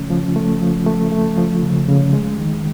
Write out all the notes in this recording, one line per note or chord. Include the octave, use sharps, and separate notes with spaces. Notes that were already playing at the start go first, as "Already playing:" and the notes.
Already playing: C#3 F3 A3 C#4
F3
A3
F3
A3
A3
F3
C#3
C#3
G#3
D#3